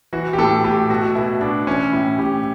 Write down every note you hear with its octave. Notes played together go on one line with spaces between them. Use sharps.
E3 F#4
G4
A2 A4
A2 G4
B2 F#4
B2 E4
B2 D4
E3 C#4
A2 E4
A2 G4